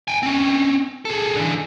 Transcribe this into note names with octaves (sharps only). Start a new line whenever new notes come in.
G5 G#5
C4 C#4
G#4 A4
D3 E3